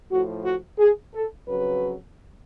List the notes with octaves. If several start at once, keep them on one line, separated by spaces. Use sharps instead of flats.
A2 F3 F#4
F#4
G#4
A4
F2 C#3 F#3 B4